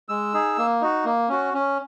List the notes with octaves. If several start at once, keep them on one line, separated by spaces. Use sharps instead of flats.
G#3 E6
D#4 G#4
A#3
D#4 F#4
A#3
C#4 F#4
C#4